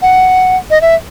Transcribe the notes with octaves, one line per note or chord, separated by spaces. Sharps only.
F#5
D#5
E5